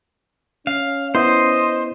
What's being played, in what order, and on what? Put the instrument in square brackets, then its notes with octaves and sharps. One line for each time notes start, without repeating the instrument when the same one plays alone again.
[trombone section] C#4 [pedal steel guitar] F5
[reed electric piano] B3 E4 [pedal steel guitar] C5 [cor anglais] D#5